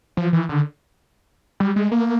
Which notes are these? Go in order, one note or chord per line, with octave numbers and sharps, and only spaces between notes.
F3
E3
D3
G3
G#3
A#3